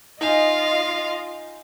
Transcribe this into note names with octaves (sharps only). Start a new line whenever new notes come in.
D#4 F4 D#5 F5 G#5